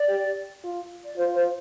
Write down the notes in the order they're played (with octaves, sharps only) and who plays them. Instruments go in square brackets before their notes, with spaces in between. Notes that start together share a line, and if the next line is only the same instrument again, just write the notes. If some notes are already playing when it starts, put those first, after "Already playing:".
Already playing: [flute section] D5
[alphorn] G4
F4
[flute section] D5
[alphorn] F4 [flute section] C5
[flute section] C5